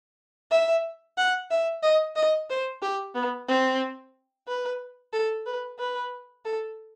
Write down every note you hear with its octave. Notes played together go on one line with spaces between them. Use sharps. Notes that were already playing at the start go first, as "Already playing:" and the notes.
E5
F#5
E5
D#5
D#5
C5
G4
B3
C4
B4
A4
B4
B4
A4